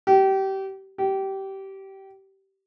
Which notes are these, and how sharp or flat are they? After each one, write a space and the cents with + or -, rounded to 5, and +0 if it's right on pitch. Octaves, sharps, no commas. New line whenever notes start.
G4 -25
G4 -20